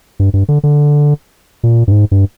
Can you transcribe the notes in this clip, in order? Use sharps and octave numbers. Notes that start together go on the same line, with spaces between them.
G2
G2
D3
D3
A#2
G2
G#2
G2